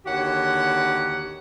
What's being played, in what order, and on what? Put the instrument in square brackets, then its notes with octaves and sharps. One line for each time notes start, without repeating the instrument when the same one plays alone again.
[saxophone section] D#2 D3 F#4 G4 C#5 F#5